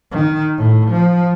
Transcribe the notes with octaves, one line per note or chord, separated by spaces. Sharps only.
D#3
A2
F3